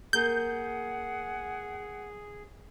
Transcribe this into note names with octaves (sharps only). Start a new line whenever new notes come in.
A#3 G#4 A#4 F#5 G6